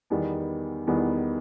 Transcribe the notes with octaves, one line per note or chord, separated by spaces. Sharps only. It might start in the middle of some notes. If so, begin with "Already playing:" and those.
E2 D#3 G3 B3
E2 D#3 G3 B3